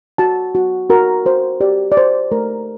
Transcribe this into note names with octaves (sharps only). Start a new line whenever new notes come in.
F#4 A5
F#4
F#4 A#4
F#4 C5
G4 D5
D5
G4 C5
A3 A#4